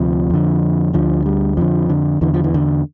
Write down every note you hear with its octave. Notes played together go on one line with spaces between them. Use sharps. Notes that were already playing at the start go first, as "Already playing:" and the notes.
Already playing: D2 C3 F3
F2 D3
D2 D3 F3
G3
F2 D3 F3
D3
E2 D3 E3
F3
E3
D3